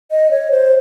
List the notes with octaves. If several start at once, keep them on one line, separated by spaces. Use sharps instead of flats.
D#5
C#5
C5